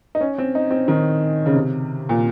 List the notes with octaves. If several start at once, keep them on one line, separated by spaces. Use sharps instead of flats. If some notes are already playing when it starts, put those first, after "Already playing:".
D#4
C#4
C4
D#4
C4
D#3
C#3
C3
A#2